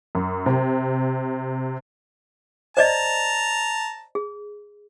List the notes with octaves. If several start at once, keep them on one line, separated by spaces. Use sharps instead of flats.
F#2
C3
C5 D5 D#5 A5 A#5
G#4